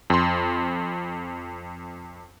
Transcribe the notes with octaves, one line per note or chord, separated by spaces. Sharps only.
F2 C6